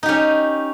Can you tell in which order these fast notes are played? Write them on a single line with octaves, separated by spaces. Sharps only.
D#4 G4 C#4